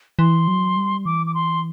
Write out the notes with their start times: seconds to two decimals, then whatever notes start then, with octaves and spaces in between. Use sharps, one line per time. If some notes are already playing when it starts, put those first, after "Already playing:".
0.19 E3 C6
0.48 F#3
0.77 G3
1.05 E3 D6
1.26 D6
1.34 C6